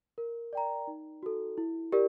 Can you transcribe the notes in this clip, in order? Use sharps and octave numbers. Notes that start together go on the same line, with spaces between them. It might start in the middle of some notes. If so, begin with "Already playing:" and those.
A#4
D5 G5 A#5
D#4
F#4 A4
E4
G4 A#4 D5